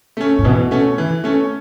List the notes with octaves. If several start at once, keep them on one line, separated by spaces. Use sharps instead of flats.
A3 C#4
A2
B2 E3
A3 C#4
E3
A3 C#4